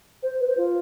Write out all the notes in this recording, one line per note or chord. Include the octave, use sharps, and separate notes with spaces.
C5
B4
C5
F4